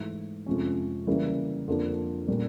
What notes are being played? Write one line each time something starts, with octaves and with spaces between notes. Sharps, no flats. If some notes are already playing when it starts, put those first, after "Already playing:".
Already playing: G#2 E3 A3
F2 C3 F3 G#3 C#4
C#3 E3 G3 A#3
F2 D3 F3 A#3 D4
A#2 G3 A#3 C#4